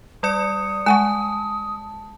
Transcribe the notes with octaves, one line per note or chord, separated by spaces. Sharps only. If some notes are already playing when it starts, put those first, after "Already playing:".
G3 D5 D#6 C#7
G#3 F#5 G#5 A5 C#6